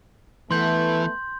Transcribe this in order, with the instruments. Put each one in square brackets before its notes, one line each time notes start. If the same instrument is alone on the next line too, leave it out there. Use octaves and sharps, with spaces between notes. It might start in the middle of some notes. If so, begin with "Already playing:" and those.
[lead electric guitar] E3 [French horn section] A3 B3 [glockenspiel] C6 G6